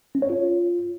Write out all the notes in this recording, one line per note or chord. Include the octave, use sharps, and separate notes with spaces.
C#4
C#5
F4